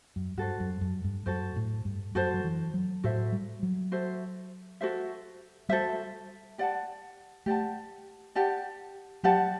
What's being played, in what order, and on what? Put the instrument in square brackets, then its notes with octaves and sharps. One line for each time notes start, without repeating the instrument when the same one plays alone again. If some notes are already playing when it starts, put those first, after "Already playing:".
[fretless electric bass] F#2
[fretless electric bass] G2 [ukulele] F#4 A4 C5
[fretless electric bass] F#2
F#2
G2
[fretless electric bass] F#2 [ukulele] F#4 A4 C5
[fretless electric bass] A2
G2
[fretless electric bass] F#2 [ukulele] F#4 A4 C5
[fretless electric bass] F#3
E3
F#3
[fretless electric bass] A2 [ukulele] F#4 A4 C5 E5
[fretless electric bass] G3
F#3
[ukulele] F#4 A4 C5 E5
F#4 A4 C5 E5
[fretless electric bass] G3 [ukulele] F#4 A4 C5 E5
[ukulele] G4 D5 F#5 A5
[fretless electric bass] A3 [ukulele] G4 D5 F#5 A5
[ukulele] G4 D5 F#5 A5
[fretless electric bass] F#3 [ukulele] G4 D5 F#5 A5